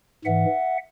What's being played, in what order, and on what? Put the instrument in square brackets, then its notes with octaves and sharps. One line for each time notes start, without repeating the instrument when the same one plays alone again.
[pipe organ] G#2 E3 E5 F#5